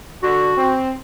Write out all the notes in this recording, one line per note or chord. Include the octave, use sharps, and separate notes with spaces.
D3 F#4
C4